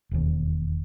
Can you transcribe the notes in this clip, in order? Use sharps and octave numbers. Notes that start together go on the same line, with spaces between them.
E1 D#2